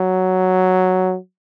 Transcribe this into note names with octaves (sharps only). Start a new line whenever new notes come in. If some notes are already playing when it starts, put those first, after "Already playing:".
Already playing: F#3